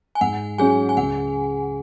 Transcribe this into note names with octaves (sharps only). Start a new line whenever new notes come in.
G#5
G#2 F#5
F#3 C#4 G#4 G#5
G#5
C#2 F#5